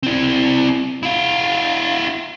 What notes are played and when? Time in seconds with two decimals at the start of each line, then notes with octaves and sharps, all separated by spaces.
0.03 C4 E4
1.03 E4 F5